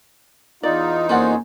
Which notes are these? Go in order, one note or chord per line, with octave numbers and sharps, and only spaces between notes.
E2 D#4 F4 D5
F2 A#3 C#4 F4 C5 D5 F#5 G#5